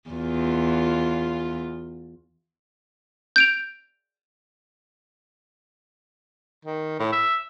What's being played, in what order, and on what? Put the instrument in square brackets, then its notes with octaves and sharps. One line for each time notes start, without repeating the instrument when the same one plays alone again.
[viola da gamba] E2 F4
[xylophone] G6 D7 F7
[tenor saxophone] D#3
A2
E5